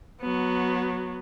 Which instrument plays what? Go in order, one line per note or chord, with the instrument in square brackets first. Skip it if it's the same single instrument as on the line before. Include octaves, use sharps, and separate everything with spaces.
[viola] F#3 B3